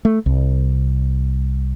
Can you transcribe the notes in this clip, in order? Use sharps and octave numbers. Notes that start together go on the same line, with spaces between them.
A3
C2